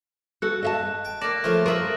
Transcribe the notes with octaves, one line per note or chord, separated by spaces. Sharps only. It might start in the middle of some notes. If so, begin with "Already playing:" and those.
F#4 A4 F#6
D#5 E5 A5
G5
A#3 D5 D6 A#6 E7
C#3 F3 A3 F4
F4 A#4 E5 C#6 D#6 F#7